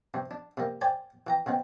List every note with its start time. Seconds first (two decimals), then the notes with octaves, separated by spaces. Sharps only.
0.14 G2 C3
0.31 D4
0.57 C3 G3 A#3
0.81 C5 D5 G5 G#5
1.27 E3 G5 A#5
1.46 C#3 G#3 B3 C4